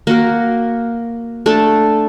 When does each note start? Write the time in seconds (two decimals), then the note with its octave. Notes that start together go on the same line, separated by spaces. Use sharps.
0.07 A#3 F#4 A#4
1.46 A3 D4 A4